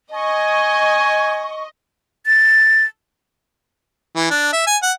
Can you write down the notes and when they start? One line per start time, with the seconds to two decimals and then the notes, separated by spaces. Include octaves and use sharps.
0.14 D#5 G#5 C#6
2.26 A6
4.16 E3
4.31 D4
4.53 E5
4.67 G#5
4.83 F#5